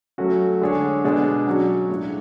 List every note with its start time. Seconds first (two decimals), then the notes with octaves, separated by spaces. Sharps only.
0.18 F#3 A3 C#4 F#4
0.62 D3 G#3 D4 G#4 C#5
1.04 B2 G#3 D4 G#4
1.47 F#3 C#4 F#4 C#5
1.89 A2 G#3 D4 F4